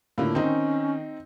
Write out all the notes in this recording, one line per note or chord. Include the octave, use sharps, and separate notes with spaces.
A2 D3 A#3 F4
D#3 C4 C#4 D#4